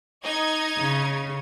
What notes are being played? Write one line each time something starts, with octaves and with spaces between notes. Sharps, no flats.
D#4 D#5 G#6
C#3